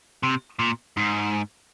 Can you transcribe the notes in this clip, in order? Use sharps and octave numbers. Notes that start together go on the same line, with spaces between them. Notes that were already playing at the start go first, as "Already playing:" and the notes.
C3
A#2
G#2